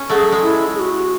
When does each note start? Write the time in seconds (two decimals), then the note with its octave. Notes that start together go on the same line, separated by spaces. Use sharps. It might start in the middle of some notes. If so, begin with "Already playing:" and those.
Already playing: C#4
0.10 F#3 A3 G#4
0.32 G#3
0.42 E4
0.75 G#4
0.80 F#4